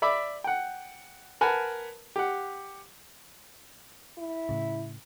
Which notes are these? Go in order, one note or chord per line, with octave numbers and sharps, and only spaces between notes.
D5 E5 B5 D6
F#5 G5
A#4 B4 F#5 G#5 A5 B5
G4 F#5
E4
A2 C#3